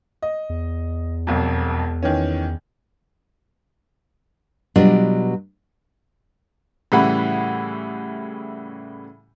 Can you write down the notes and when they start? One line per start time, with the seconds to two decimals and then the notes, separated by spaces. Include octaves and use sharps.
0.22 D#5
0.50 E2
1.27 E1 B1 F2
2.03 D#3 E3 C#4
4.76 B2 F#3 G3 D4 F4
6.92 A2 C#3 E3 G3 F#5 B5